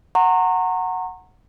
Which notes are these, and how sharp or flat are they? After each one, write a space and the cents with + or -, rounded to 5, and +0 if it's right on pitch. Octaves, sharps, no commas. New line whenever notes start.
F#5 +0 A#5 -20 C#6 -40